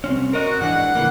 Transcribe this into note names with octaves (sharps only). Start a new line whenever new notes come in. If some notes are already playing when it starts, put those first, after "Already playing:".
C2 C4 C#4
F#4 A#4 D#5
G#2 E3 D4 F#5
C#3 E3 A#3